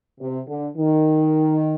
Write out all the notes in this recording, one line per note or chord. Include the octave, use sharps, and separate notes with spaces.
C3
D3
D#3